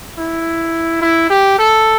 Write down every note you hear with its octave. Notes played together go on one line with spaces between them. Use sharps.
E4
E4
G4
A4